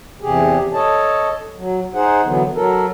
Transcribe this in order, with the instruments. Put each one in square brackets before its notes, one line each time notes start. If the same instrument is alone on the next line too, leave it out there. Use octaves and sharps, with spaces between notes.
[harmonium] E2 C3 G4 G#4
A4 C#5 D#5 A5
F#3
D#4 G#4 C5 F#5
D3 E3 F#3 B3
F#3 A4 A#4